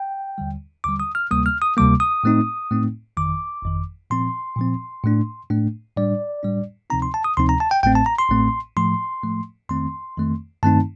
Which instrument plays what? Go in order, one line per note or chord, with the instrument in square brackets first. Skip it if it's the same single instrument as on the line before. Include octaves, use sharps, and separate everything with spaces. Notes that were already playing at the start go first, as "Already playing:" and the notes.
Already playing: [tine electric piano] G5
D#2 D3 G3
D#2 D3 G3 D6
D#6
F6
D2 C3 G3 A#3 D#6
F6
D#6
D2 C3 G3 A#3 D6
D#6
A2 A3 C4 D#4
A2 A3 C4 D#4
G1 F2 D#3 D6
G1 F2 D#3
A#2 F3 C4 C6
A#2 F3 C4
A2 A3 D4
A2 A3 D4
A2 G3 D4 D5
A2 G3 D4
D2 C3 F3 C4 D#4 A#5
C6
A5
D#6
D2 C3 F3 C4 D#4 C6
A#5
A5
G5
A1 A2 A3 C4 G5
A5
A#5
C6
A1 A2 A3 C4
A2 F3 A3 C6
A2 F3 A3
F2 D#3 A3 C4 C6
F2 D#3 A3 C4
G2 D#3 A3 C4 D#4 A5